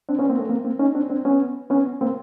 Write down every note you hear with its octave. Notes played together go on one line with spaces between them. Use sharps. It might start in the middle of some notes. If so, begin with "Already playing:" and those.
C4 D4
B3 C#4
A#3 C4
A3 B3
A#3 C4
A#3 C4
C#4 D#4
C4 D4
C4 D4
B3 C#4
B3 C#4
A#3 C4